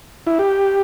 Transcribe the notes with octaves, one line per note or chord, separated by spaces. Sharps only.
E4
G4